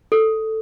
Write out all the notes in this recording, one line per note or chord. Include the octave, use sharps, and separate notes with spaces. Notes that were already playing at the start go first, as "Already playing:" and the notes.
A4